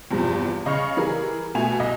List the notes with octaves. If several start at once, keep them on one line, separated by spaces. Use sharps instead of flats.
E2 G2 C3 F3
C#3 D#5 F5 C#6 F6 C#7
E3 G3 G#4 A#4
B2 A3 G#5 F7
C2 D#5